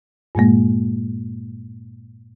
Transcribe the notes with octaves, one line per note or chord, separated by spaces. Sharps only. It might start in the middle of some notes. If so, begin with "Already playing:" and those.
G2 A#2 G#3 A#3